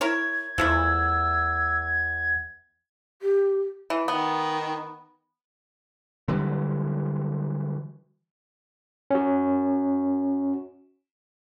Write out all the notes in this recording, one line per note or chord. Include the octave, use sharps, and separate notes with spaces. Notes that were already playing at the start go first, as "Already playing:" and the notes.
E4 A#4 C#5 G#6
E2 F3 A3 E4 E6
G4
E3
D#3 B3
D3 E3 F#3 G3
C#4 F#4